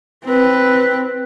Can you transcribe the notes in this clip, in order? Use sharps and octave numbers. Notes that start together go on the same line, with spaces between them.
C4 B4